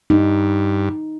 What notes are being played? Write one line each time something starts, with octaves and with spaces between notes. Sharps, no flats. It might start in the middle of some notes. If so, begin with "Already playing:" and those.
G2 D#4